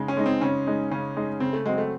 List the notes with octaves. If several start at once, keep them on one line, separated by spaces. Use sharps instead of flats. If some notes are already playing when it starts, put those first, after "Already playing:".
Already playing: C#3 G#3 D#4
C#4
G#3 D#4
C4
C#3 C#4
G#3 D#4
C#3 C#4
G#3 D#4
C#3 C4
A3
F#3 G#3 C4
A3